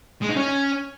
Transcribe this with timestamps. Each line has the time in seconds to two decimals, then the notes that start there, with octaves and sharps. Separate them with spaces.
0.22 G#3
0.29 D#4
0.36 C#4